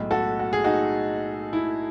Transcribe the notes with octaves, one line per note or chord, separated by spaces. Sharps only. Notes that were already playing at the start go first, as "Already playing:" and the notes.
Already playing: B1 A2 G#3
F#4 A4
F#4
G#4
D#4 F#4
E4